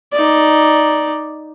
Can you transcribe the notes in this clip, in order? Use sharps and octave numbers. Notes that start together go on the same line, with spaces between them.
D#4 D5